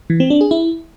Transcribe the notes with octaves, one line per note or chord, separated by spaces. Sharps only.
E3
C4
D4
G#4
E4